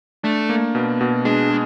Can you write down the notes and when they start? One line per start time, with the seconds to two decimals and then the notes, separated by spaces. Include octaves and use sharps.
0.24 A3 D4
0.49 A#3
0.75 B2
1.01 B2
1.25 G#3 D4
1.50 G#3